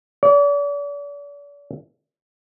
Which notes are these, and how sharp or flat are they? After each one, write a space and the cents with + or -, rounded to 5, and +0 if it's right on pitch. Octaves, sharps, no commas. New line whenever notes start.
D5 -40